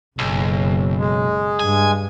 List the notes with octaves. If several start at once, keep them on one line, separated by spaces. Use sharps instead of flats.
F#1 B1
G#3
G2 G#5